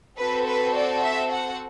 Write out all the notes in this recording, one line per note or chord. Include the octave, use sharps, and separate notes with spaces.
C4 F#4 A4 B4
B4
D5
E5
F#5